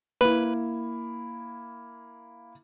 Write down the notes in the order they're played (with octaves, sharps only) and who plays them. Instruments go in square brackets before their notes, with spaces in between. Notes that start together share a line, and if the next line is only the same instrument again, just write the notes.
[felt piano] A#3 E4 [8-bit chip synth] B4